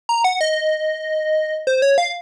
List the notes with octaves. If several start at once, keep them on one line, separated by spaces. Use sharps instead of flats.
A#5
F#5
D#5
C5
C#5
F5